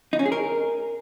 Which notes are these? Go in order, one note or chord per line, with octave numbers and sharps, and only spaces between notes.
D#4
C#4
G#4
A#4